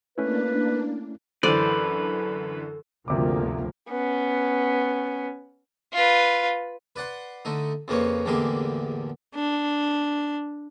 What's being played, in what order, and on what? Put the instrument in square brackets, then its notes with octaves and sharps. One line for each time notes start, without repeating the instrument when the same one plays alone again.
[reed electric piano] A3 C#4 E4 [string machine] A#3 D4 [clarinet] B4
[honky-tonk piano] F#2 D3 E3 [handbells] A4 [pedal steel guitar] B4 [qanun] C5 D5
[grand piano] G1 C3 D6 [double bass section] D2 F3 A#3
[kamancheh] B3 C#4
[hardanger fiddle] F4 B4
[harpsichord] B4 D5 F#5 C6
D3 A3 D#4
F2 C#3 A#3 B4 C#5
A1 E2 D3 A#3 G4 G#4
[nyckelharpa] D4